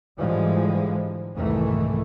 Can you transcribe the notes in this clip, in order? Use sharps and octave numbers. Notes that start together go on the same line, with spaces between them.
G#2 D3 E3 F3 G3 G#3
C2 F2 G#2 D#3 E3 A3